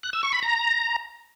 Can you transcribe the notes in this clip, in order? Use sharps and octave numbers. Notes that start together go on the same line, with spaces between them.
F#6
E6
C#6
B5
A#5